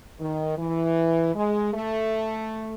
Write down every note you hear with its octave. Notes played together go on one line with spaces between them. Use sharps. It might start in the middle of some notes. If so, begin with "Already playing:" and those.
D#3
E3
G#3
A3